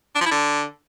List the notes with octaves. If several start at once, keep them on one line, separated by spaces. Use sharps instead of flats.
D4
F3
E4
D3